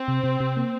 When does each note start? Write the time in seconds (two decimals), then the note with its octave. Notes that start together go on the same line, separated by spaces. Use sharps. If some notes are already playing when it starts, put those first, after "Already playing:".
Already playing: C4
0.08 C3
0.24 C3
0.40 C3
0.57 A#3